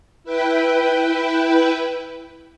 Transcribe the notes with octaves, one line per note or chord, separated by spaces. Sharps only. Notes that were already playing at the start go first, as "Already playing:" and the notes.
E4 B4 G5